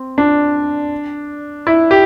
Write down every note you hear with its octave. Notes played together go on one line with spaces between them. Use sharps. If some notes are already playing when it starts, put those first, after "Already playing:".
Already playing: C4
D4
E4
G4